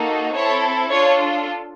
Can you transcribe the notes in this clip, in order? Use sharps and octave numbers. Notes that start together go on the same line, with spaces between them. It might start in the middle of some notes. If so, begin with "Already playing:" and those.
Already playing: A#3 D#4 F#4 A4
C4 E4 A4 C#5
D4 F4 A4 C#5